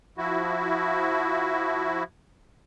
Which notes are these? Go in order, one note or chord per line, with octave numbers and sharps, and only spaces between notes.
F3 E4 F#4